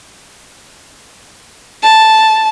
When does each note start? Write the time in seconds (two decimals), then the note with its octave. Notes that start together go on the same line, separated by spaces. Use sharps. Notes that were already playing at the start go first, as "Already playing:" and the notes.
1.83 A5